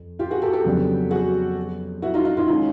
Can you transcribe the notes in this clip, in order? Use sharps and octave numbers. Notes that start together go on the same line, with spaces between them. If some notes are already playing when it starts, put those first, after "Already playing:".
Already playing: F2
F4 G4
F#4 G#4
G4 A4
G4 A4
F2 C#3 F#3 B3 D4
F#4 G#4
E4 F#4
D#4 F4
D#4 F4
D#4 F4
D#3 G#3 C#4 D#4 F4 F#4